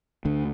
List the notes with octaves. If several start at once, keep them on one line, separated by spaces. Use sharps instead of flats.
D2 D3